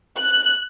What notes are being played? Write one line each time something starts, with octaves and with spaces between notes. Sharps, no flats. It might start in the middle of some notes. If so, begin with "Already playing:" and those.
F#6